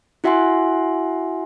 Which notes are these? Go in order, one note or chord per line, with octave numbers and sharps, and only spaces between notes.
E4 F#4 E5 F#5 G#5 C6